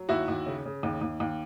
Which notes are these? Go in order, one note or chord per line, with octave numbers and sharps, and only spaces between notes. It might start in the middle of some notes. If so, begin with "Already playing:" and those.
Already playing: F#3
D#2 E4 F#4
D#2
C#3
C#3
D#2
D#2
D#2